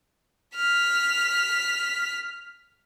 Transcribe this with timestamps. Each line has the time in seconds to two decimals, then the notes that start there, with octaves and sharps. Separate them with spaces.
0.55 F6 B6